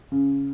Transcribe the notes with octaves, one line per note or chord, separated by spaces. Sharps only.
C#3